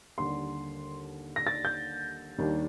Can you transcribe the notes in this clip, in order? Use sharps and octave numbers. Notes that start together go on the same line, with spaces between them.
D#2 D3 G3 D4 C6
A#6
A6
G6
D#2 D#3 G3 D4